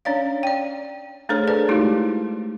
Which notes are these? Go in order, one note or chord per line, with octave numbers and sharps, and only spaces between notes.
C#4 D4 C#5 D5 F5
D5 G5
A3 D4 G#4 A4 C5 C#5
G#4 B4 D5 A5
G#3 A3 D#4 E4 F#4 G4